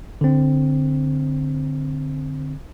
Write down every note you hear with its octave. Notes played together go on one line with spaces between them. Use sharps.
D3 C4